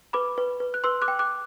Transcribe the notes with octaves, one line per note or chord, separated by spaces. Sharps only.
B4 B5 D6
B4
B4
F#6
B4 C6 E6
D6 F#6
G5
D6 F#6